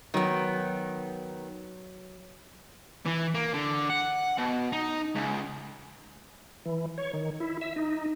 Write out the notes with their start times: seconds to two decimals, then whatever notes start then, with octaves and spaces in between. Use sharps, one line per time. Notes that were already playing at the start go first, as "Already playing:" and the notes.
0.14 D#3 F#3 B3
3.06 E3
3.35 A#3
3.53 D3
3.90 F#5
4.38 B2
4.72 D#4
5.15 C#2
6.66 E3
6.98 C#5
7.14 D#3
7.40 E4
7.61 E5
7.76 D#4